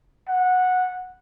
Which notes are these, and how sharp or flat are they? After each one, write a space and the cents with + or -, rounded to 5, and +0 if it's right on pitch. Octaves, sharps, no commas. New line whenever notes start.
F#5 -15